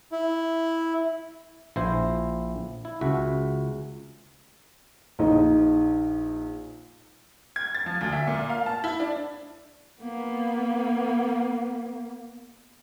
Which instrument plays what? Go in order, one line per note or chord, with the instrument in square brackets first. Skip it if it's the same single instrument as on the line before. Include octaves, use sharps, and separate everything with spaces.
[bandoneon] E4
[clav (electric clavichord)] A#1 E4 C5
E4
C#2 F#4 E5
[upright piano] A#1 D#4
[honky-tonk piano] G#6
A6
F3
D2
E5
A#2
F5
A5
E4
D4
[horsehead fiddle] A#3 B3